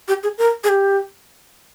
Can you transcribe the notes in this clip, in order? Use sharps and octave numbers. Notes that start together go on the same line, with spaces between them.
G4
G#4
A#4
G#4
G4